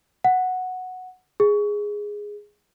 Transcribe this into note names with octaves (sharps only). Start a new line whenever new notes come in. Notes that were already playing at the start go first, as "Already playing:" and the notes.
F#5
G#4